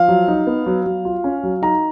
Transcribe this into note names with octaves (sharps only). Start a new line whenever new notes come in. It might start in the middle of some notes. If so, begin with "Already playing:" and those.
Already playing: F3 F5
F#3
D#4
B3
F#3
F#3
F4
C#4
F#3
D#4 A#5